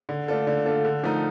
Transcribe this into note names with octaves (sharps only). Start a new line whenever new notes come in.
D3
A3 D4 F4 A4
D3
A3 D4 F4 A4
D3
F3 A3 D#4 A#4